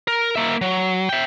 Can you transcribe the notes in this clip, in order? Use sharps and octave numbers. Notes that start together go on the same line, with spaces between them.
A#4
A#3 E5
F#3
E5 G5